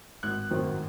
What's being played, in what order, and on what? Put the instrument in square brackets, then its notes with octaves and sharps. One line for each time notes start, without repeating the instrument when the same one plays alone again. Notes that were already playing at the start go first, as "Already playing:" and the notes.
[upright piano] G#1 F#6
F#2 D#3 F#3 C4